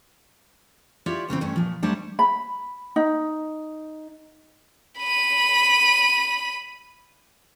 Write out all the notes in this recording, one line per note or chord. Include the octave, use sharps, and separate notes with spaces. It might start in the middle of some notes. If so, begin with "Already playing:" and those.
E4 F4 G4 C#5 D5 E5
E2 C#3 E3 C4
G2 A3 C#4
A#2 F3
F#3 G3 A3 D4 C5 C#5
B5
D#4
B5 D#7